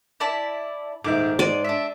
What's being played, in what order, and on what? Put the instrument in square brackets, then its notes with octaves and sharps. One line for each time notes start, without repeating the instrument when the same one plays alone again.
[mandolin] E4 D5 A5
[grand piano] D#1 D#3 E5 [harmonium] G#2 [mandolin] D6
[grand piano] G#3 D#7 [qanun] D5
[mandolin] D4 E5